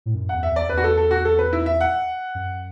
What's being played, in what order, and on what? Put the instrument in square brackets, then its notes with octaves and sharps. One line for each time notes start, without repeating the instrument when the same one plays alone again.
[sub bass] A2
F#2
[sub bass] E2 [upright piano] F#5
[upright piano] E5
[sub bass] E2 [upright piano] D5
[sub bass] E2 [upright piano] B4
[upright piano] F#4
A4
A4
F#4
A4
B4
E4
E5
F#5
[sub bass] F#2